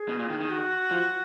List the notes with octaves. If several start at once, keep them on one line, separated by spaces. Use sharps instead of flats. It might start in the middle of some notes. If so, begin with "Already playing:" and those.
Already playing: G#4
B2
A#2
D#3
D#3
F#4
F3